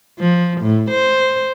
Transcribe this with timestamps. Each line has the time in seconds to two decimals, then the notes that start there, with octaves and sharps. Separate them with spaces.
0.19 F3
0.60 A2
0.90 C5